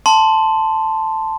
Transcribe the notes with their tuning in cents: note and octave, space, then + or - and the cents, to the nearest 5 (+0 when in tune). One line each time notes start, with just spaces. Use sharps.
A5 +0 C6 -5